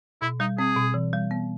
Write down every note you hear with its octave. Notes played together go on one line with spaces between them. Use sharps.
B2 E4
G3 D#4
C4 G#4
B2
E3
G3
B3